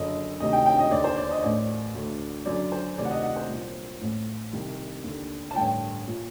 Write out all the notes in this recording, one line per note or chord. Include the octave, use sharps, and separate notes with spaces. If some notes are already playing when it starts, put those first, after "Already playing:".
Already playing: F#1 F#2 D3 D#5
D2 C3 D#3 D#5
G5
G5
D#5
D#2 D3 D5
C5
D5
D#5
A1 A2 D5
D2 D3
F#1 F#2 D3 D5
C5
D2 C3 D#3 D5
F#5
D#5
F#5
C5
C2 A#2
A1 A2
C2 C3 D#3
D#2 D3
A5
A1 G2 D3 G5
A#2